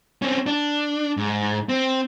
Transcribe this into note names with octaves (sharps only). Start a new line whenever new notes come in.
C4 C#4
D4
G#2
C4